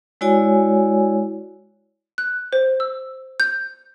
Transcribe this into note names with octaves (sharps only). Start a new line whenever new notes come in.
G#3 E4 F#4 C#5 D5 G#5
F#6
C5
E6
G6